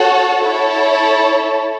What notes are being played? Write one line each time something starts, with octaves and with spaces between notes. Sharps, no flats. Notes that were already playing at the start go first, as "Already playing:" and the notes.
Already playing: F#4 A4 C#5 F#5
E4 A4 C#5